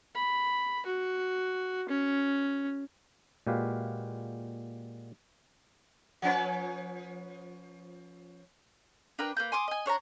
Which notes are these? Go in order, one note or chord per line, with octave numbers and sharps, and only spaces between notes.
B5
F#4
C#4
A#2 G#3 F#4 G4 B4 F5
F3 C#4 B4
D4 A#4 B4 G5
A#3 B4 G6
G#5 C6 D6 D#6
D#5 G#5
D4 C#5 F#5 A#5